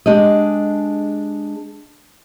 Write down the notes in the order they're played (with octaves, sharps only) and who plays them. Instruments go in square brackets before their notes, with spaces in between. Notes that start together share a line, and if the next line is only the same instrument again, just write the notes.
[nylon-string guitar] G#3 D4 G4 D#5